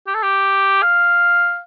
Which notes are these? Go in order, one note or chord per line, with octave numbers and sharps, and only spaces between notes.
G4
A4
G4
F5